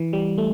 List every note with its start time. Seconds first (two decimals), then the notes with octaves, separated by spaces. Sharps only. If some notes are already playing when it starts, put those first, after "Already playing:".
Already playing: E3
0.13 G3
0.38 A3